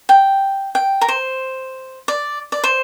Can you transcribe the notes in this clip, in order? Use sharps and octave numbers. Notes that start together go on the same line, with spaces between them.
G5
G5
A#4
C5
D5
D5
C5